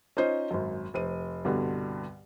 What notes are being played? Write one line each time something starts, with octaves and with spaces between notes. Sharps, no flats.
C#4 D#4 F4 C5 D#5
G#1 F#2
F1 C5 D#7
C2 G2 B2 D3